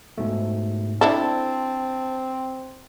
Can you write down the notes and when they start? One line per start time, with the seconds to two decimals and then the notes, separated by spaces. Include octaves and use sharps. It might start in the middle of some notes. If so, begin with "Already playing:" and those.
0.18 G#2 B2 A3
1.01 C4 D4 E4 A4 A5